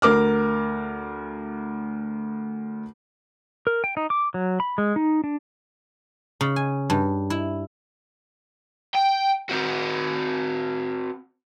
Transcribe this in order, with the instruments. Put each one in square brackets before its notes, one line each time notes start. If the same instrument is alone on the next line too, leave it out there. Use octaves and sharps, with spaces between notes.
[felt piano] D2 A#4 D6 F6
[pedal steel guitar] A#4
G5
D#4
D6
F#3
B5
G#3
D#4
D4
[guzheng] C#3
G#5
G2
E4
[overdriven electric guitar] G5
C4 F#4